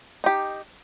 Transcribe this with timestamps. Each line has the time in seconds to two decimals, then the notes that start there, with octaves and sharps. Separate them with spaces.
0.24 D#4 G4